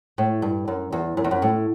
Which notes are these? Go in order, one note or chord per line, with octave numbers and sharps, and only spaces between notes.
A2
G2
F#2
E2
F#2
E2
F#2
A2